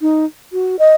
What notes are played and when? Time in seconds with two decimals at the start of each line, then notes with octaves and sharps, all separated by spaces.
0.01 D#4
0.53 F#4
0.79 D#5